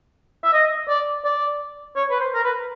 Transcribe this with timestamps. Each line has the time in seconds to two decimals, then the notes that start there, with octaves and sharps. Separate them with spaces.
0.44 E5
0.53 D#5
0.89 D5
1.25 D5
1.96 C#5
2.10 B4
2.20 C5
2.34 A#4
2.44 B4